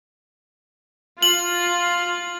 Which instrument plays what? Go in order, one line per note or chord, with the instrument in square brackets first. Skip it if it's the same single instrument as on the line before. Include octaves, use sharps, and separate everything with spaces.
[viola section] F4 [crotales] F#7